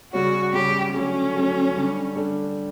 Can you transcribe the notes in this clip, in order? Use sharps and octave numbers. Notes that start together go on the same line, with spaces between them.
C#3 G3 C#4 F#4
C#3 G3 C#4 G4
D3 F#3 A3 C#4
D3 F#3 A3
D3 G3 D4
D3 G3 D4